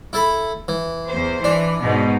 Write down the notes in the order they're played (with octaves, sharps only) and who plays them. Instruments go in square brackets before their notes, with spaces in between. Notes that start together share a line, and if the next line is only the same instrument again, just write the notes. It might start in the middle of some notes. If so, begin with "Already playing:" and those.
[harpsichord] E4 A4 B5
E3
[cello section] E2 C5
[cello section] E3 [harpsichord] D4
[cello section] G#2 B2 D#4